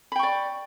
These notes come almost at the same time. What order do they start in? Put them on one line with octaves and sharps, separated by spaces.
B5 G5 C#6 D5